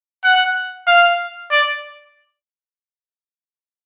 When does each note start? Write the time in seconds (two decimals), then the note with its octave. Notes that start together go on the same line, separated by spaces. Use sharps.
0.24 F#5
0.87 F5
1.51 D5